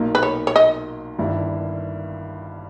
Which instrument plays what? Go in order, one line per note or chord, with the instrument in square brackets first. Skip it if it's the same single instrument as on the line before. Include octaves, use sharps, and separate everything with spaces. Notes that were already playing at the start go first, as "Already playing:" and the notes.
Already playing: [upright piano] B1 A#2 A#3 D#4
[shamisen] B4
C#5
C#5
D#5
[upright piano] G1 G2 D#3 A#3 E4